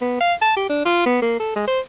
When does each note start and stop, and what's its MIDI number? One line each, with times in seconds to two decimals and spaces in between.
0.01 0.19 59
0.21 0.34 77
0.42 0.52 81
0.57 0.66 67
0.69 0.85 62
0.86 1.02 65
1.06 1.21 59
1.22 1.37 58
1.40 1.52 69
1.56 1.65 56
1.67 1.80 72